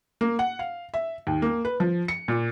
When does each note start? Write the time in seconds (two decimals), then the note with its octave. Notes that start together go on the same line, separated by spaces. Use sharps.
0.21 A#3
0.39 F#5
0.59 F5
0.94 E5
1.27 D#2
1.42 A#3
1.65 B4
1.80 F3
2.08 C#7
2.28 A#2